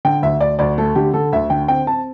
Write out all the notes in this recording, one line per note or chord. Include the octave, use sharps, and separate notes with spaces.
D3 G5
D2 E5
D2 D5
D2 D5
A3 A4
D3 G4
D3 A4
D2 E5
D3 G5
C4 G5
C4 A5